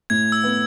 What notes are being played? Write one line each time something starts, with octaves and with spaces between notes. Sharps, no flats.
A2 G#6
E6
B3